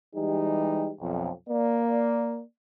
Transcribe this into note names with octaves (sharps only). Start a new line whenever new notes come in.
E3 G3 G#3 D#4 G4
B1 F2
A#3 D5